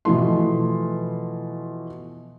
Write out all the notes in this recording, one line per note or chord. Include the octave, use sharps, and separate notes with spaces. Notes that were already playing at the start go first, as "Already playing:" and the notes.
B2 E3 F3 A3 C6